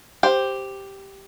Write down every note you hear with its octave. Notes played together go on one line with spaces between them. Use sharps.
G4 C5